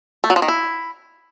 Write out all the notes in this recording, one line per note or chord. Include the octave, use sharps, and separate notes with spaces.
A3
F#3
F3
D#3
E4